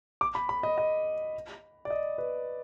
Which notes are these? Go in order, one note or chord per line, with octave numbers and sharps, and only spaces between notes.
D6
B5
B5
D#5
D#5
D5
D#5
B4